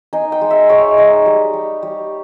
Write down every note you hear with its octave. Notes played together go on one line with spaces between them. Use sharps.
D#4 G#5
G5
G#3
E5
G#3 C#5
D#4
G3
G3
G3